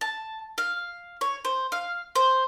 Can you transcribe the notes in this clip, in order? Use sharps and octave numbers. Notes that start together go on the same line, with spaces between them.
A5
F5
C#5
C5
F5
C5